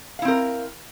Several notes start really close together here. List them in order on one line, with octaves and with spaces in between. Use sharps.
F5 E4 C4 A#4